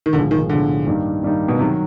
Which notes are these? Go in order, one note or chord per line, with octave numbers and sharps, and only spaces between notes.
D#3
B1 A2 D3 F3 G#3
D#3
B1 A2 D3 F3 G#3
G2 D#3 G3 A#3 D#4
G2 D#3 G3 A#3 D#4
B2
C3 D#3 F#3